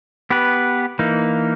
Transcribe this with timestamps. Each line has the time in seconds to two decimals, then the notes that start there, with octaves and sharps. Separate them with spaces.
0.30 B3 G4 B4
0.99 E3 A#3 D#4